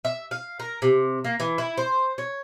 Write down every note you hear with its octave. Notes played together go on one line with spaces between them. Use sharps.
E5
F5
A#4
C3
A#3
E3
E4
C5
C#5